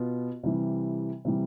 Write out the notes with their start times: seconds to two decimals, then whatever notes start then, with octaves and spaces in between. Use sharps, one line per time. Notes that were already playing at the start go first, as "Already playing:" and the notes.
Already playing: B2 B3 F4
0.43 C3 E3 G3
1.25 C3 E3 G3